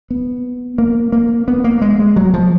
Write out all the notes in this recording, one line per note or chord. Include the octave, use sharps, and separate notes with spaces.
B3
A#3
A#3
B3
A#3
G#3
G#3
F#3
F3